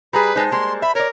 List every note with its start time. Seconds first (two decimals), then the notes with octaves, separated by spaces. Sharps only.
0.13 G3 G#4 B4 A#5 B5
0.36 G#3 D#4 C5 A5
0.51 G3 G#3 A#3 C6
0.82 E5 B5
0.95 A#4 C#5 D5